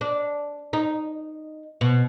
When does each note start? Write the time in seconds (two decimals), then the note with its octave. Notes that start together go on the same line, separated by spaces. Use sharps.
0.01 D4
0.73 D#4
1.81 B2